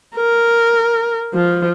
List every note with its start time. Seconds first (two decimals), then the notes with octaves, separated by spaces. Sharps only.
0.16 A#4
1.34 F3